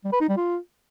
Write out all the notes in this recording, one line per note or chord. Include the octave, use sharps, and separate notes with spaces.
G3
B4
D#4
G3
F4